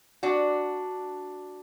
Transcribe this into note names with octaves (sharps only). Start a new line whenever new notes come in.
D4 F#4